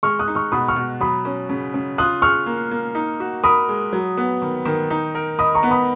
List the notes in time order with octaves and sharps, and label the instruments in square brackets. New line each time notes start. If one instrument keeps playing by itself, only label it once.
[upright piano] G#3 [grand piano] C#6 F6
[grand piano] D#6 F#6
[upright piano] D#4
[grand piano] C#6 F6
[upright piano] B2 [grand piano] B5 D#6
[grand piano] C#6 F6
[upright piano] B2
[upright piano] F#3 [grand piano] B5 D#6
[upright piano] C#4
C#3
C#3
[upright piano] F4 [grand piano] D#6 F#6
[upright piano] G#4 [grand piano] C#6 F6
[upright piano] A#3
A#3
D#4
F#4
[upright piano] A#4 [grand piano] B5 D#6
[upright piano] G#3
F#3
B3
D#3
D#3
D#4
A#4
[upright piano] D#5 [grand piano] B5 D#6
[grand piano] A#5 C#6
[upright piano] B3
[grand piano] B5 D#6